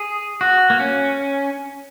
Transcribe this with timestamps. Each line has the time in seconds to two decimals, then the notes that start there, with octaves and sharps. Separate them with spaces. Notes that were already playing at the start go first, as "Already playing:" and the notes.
Already playing: G#4
0.41 F#4
0.70 A#3
0.80 C#4